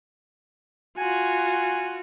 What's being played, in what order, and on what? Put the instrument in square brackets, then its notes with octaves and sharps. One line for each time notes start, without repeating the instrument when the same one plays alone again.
[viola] F4 F#4 [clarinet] G#5